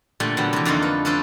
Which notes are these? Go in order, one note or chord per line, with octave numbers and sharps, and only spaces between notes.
A#2 D3 G3 A3
D3 F#3 G3 B3
C3 E3
F2 D3 A3 A#3 D#4 F4
B4
C#4 D4 A4 B4 C5